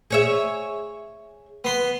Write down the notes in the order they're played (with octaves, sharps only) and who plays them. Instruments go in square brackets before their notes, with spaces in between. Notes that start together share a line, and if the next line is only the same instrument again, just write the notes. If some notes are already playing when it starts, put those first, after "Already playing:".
[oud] G#4 C#5 E5
[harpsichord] B3 C6